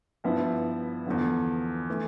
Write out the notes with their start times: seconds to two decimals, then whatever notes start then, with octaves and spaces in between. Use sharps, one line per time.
0.24 G2 F3 B3 E4
1.06 E2 D3 F3
1.90 E3 A3